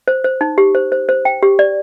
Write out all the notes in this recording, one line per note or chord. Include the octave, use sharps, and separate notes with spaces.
C5
C5
D#4
G4
C5
C5
C5
G5
G4
D5